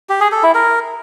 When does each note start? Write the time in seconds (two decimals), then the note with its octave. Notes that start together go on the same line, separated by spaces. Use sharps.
0.09 G4
0.21 G#4
0.32 A4
0.43 E4
0.55 A#4